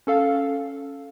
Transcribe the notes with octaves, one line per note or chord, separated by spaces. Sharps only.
C#4 A4 F5